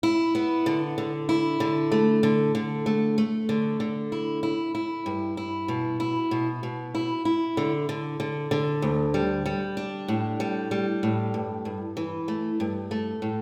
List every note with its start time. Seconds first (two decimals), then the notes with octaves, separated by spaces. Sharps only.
0.03 E4
0.35 B3
0.66 D3
0.98 D3
1.29 E4
1.60 D3
1.92 A3
2.23 D3
2.55 D3
2.86 A3
3.18 A3
3.49 D3
3.80 D3
4.12 E4
4.43 E4
4.75 E4
5.06 G2
5.37 E4
5.68 B2
6.00 E4
6.31 B2
6.63 B2
6.95 E4
7.25 E4
7.57 D3
7.89 D3
8.20 D3
8.51 D3
8.82 D2
9.14 G3
9.46 G3
9.77 D4
10.08 A2
10.40 G3
10.71 G3
11.03 A2
11.34 G2
11.65 G2
11.97 E3
12.28 A3
12.60 G2
12.91 A3
13.22 A2